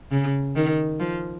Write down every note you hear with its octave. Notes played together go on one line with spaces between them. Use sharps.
C#3
D#3
F3